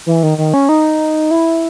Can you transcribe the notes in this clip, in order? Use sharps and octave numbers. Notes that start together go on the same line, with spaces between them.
E3
D#3
D#3
C#4
D#4
E4